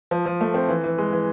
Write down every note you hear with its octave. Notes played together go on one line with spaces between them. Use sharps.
F3
F3
A3
C4
E3
E3
G#3
E3